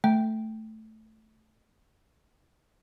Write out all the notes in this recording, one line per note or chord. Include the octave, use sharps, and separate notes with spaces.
A3 G5